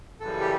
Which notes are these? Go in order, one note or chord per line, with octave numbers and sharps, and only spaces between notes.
F#2 C#3 E3 G3 A4
G4